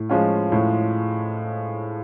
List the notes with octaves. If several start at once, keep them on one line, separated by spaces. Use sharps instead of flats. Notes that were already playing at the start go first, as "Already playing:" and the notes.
Already playing: A2
F3 G#3 C#4 F4
A2